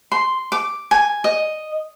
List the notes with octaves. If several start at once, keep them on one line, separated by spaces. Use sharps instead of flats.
C6
D6
G#5
D#5